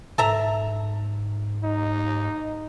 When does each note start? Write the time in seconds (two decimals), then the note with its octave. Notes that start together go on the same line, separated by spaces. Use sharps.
0.18 G#2 A4 E5 A#5
1.64 D#4